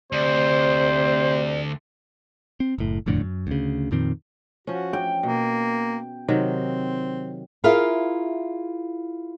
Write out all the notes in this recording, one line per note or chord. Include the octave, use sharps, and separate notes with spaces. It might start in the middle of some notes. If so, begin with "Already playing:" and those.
D2 C3 C5 D5
C4
F#1 A2
E1 F2 A2 D3
F#2
D2 C#3
F2 A#2 D#3 C4
F3 C#4 F#4
G5
B2 A#3
C3 D#3 F#3 C4
E4 F4 G#4 A#4 E5 F5